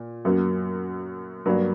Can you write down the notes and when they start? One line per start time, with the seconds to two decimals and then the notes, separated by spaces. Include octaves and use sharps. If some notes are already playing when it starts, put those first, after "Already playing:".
Already playing: A#2
0.25 F#2 F#3 A#3
1.46 G2 F#3 A#3